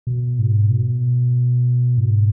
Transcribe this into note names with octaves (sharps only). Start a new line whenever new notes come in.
B2
G#2
B2
G#2